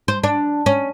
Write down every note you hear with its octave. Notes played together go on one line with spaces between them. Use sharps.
C5
D4
C#4